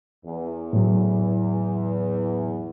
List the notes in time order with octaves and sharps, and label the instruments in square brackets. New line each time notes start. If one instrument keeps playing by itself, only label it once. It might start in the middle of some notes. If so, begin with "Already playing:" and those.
[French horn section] E2
[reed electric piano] A2 F#3